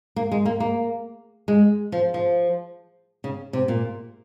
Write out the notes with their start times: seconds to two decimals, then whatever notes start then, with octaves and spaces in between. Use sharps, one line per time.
0.16 A#3
0.32 G#3
0.45 A#3
0.60 A#3
1.48 G#3
1.92 F3
2.14 F3
3.24 C#3
3.53 C3
3.68 A#2